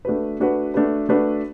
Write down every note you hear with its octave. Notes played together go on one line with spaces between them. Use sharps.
A3 D4 F#4 B4
A3 D4 F#4 B4
A3 D4 F#4 B4
A3 D4 F#4 B4